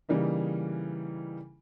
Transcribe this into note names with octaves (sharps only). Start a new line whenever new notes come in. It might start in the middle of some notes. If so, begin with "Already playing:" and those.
C#3 E3 G3 A#3 D#4